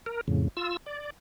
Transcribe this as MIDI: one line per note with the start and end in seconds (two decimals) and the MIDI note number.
0.06 0.21 70
0.28 0.48 41
0.28 0.48 45
0.28 0.48 49
0.57 0.77 65
0.57 0.77 88
0.86 1.10 74